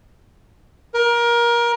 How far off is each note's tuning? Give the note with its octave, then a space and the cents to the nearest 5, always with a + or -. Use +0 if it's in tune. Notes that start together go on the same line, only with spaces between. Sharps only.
A#4 +25